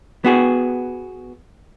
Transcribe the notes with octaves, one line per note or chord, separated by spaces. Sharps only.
B3 F#4 G#4